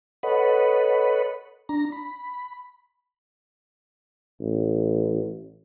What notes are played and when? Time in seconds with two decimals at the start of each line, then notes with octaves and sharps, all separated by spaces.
0.23 A4 B4 C#5 D#5 F#5 B5
1.69 D4 A#5
1.92 B5
4.40 A1